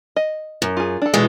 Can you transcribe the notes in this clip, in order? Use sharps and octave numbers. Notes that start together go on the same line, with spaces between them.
D#5
F#2
F4 G#4
D4 A4
B2 E3 G#3